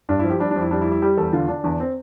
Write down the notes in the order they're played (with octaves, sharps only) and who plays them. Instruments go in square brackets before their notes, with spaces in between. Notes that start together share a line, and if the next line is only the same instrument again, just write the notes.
[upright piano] G2 D4
F3 E4
G4
G3 D4
D4
F2 E4
G3 D4
E4
G3
E4
G3 G4
E2 A4
D3 F4
D3 D4
E2 D4
C4